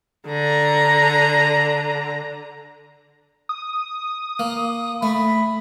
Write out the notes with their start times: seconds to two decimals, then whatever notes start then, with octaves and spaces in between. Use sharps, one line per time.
0.28 D3 A#5
3.49 D#6
4.39 A#3
5.03 A3 B5